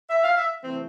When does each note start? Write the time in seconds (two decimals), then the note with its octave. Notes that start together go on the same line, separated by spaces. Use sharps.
0.10 E5
0.24 F5
0.37 E5
0.64 C3 E3 A3 C4